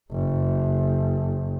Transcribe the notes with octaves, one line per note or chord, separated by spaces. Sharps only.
F#1